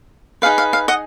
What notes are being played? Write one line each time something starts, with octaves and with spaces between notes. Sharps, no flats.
D#4 G#4 B4 F5
F5
F5
D#5 F#5